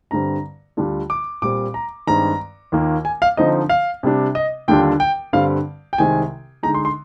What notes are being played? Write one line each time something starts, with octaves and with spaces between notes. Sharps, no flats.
G2 D3 G3 C4 A#5
D2 D3 G3 D4 F4
D6
A#2 G3 C4 D6
A#5
G2 D#3 G#3 C4 A#5
D#2 D#3 A#3 F4
G#5
F5
D3 F3 C4 D#4 D#5
F5
C3 G3 D4
D#5
D#2 D3 G3 D4 F4 G5
G5
G2 D3 G3 C4 F5
G5
C2 C3 D#3 G#3 C4 G#5
D3 G#3 D#4 A#5
C6
C6